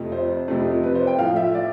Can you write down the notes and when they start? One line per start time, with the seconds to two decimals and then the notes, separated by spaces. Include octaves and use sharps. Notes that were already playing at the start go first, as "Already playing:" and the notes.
Already playing: F2 C3 F3 A3
0.12 C5
0.48 F2 C3 F3 A3
0.83 B4
0.95 C5
1.07 G5
1.18 A2 F3 A3 F5
1.36 E5
1.54 D5